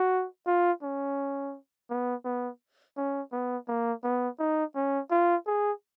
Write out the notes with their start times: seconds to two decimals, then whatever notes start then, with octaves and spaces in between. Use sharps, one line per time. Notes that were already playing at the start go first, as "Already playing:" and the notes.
Already playing: F#4
0.46 F4
0.82 C#4
1.90 B3
2.25 B3
2.97 C#4
3.32 B3
3.68 A#3
4.03 B3
4.39 D#4
4.75 C#4
5.10 F4
5.46 G#4